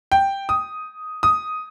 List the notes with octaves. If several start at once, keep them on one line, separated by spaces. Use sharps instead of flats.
G5
D#6
D#6